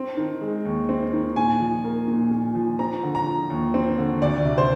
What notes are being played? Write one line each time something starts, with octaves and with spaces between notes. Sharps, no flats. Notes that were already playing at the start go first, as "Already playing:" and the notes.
Already playing: C4
D#3
G#3
D#2
C4
D#3
A#2 G#5
F3
A#3
A#2
A#2
F3
C4 A#5
D3
A#5
F3
D#2
C4
D3
D2 D5
C3
C5